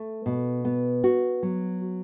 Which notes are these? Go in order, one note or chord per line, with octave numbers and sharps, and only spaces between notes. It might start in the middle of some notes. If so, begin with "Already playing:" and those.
Already playing: A3
B2
B3
F#4
F#3